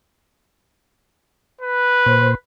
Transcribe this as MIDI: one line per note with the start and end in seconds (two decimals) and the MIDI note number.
1.61 2.35 71
2.06 2.35 46
2.06 2.35 72